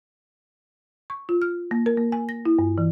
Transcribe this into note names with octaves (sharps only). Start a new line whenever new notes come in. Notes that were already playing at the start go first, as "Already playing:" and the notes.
C#6
F4
F6
A#3
A#4
A#3
G#5
A#6
E4
G2
E3